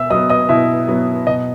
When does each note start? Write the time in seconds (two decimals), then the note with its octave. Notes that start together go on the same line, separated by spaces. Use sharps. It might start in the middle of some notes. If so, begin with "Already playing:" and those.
Already playing: B2 E5 E6
0.10 F#3 D#5 D#6
0.14 B3
0.30 D#5 D#6
0.49 B2 E4 E5
0.88 F#3 B3
1.27 B2 D#5